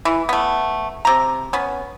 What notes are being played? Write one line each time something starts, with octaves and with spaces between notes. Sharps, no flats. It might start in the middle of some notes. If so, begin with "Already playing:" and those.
E3
A3 B3
C3 A#5
B3 C#4